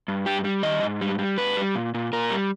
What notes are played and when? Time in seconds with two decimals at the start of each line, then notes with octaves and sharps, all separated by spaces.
0.08 G2
0.26 G3 G4
0.44 G3
0.63 D#3 D#5
0.82 G#2
1.01 G3
1.19 G3
1.38 G#2 B4
1.57 G3
1.75 A#2
1.94 A#2
2.13 A#2 A#4
2.31 G3